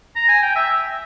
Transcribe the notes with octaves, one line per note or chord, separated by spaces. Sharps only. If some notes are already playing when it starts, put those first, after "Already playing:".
A#5
G#5
G5
E5